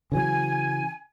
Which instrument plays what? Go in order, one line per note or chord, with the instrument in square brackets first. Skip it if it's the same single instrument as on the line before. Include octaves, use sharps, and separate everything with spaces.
[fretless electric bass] C#3 E3 F#3 [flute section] G#5